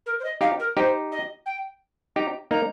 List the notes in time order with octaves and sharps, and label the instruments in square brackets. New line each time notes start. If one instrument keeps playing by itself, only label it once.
[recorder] A#4
C5
D#5
[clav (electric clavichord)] D#4 G4 [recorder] F5
[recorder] A#4
[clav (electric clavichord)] D#4 G4 [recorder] C5
[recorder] D#5
G5
[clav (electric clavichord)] D#4 G4 [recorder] A#5
[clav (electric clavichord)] A#3 D#4 [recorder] A#5